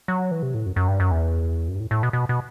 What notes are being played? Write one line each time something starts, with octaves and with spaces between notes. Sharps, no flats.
F#3
E3
C3
A2
F#2
F#2
G2
F#2
E2
F#2
G2
A2
A2
B2
B2
B2